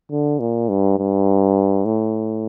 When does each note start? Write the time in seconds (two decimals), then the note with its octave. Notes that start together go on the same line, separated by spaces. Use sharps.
0.11 D3
0.40 A#2
0.69 G2
0.98 G2
1.85 A2